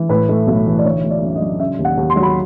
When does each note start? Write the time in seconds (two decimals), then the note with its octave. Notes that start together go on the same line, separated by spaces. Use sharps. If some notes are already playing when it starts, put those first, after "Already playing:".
Already playing: E3
0.09 A2 B4
0.29 A3
0.47 B1
0.67 E3
0.79 D5
0.85 D3 C#5
1.04 A3
1.11 D5
1.22 F#2
1.35 D#5
1.41 F#3
1.60 C#3 E5
1.79 D#2
1.85 F#5
1.97 D#2
2.10 C6
2.16 F#3
2.23 B5